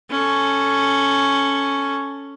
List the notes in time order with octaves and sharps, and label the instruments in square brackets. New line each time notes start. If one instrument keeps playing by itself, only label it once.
[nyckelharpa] C#4 A4